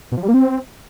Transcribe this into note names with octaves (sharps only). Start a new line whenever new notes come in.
B2
F3
G3
A#3
C4